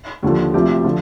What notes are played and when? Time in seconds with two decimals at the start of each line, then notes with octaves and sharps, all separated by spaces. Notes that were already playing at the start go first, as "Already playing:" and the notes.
0.23 D#2 D3 F3
0.54 D2 C3 F3 G4
0.84 D3 F3